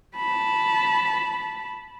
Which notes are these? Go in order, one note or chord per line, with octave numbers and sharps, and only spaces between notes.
A5 B5